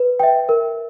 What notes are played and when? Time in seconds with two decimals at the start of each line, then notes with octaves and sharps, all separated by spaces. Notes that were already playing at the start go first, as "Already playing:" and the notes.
Already playing: B4
0.20 E5 G5
0.49 A#4